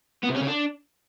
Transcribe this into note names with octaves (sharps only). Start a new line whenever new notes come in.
B3
C3
C#4
C#3
D4